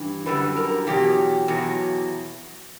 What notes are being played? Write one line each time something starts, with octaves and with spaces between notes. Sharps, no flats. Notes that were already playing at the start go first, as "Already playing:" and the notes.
Already playing: G2 E3
F#2 D3 G3 B4
A#4
E2 B2 F#3 G4
E2 B2 F#3